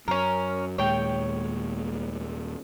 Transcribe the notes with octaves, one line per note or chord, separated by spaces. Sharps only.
F#2 C#4 A#4
D#2 A#2 G#3 C#5 G5